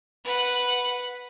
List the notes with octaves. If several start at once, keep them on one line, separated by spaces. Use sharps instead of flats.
B4 F#5